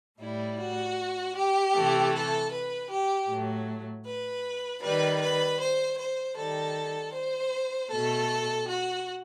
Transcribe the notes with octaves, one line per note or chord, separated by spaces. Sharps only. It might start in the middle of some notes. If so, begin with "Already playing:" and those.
A2 G3 E4
F#4
G4
C3 E3 A3
A4
B4
G4
A2 F#3 A3
B4
D#3 G3 B4
B4
C5
C5
D#3 G3 A4
C5
B2 A3 A4
F#4